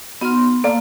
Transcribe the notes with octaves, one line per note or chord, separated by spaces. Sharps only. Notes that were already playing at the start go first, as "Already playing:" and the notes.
B3 D#4 F#4 C6 F6
A#3 A4 D5 F5